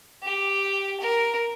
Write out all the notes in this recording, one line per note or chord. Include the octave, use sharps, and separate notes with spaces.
G4
A#4